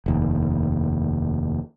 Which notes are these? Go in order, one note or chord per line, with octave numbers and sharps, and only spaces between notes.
F1 D#2